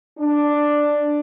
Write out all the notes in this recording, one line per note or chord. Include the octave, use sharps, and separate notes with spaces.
D4